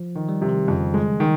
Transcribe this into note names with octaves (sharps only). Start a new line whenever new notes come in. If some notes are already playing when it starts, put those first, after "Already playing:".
Already playing: F3
D#3
G3
C3
D#3
F2 C#3
G#3
D#3